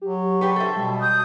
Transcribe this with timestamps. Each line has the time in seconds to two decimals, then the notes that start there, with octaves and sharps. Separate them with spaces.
0.02 F#3 G4
0.41 D4 G4 B4 C#6
0.56 A4 C5 E5
0.77 B2 G3
1.00 D#6 G6